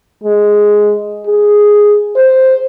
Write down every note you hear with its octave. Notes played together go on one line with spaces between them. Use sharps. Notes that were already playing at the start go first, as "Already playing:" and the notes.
G#3
G#4
C5